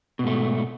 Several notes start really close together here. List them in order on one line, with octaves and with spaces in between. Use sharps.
B2 G#2 A3